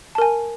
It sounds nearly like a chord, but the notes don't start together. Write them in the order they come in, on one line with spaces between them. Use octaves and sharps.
A5 A#4 G#5